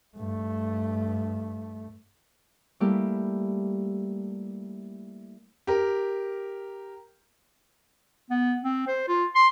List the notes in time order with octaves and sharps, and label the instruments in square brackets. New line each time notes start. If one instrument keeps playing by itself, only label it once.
[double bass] G2 A3
[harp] G3 A3 A#3 E4 G4
[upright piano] G4 A#4
[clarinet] B3
C4
C5
F4
C6